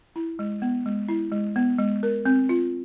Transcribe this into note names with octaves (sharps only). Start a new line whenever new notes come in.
E4
G#3
B3
G#3
E4
G#3
B3
G#3
A#4
C4
F4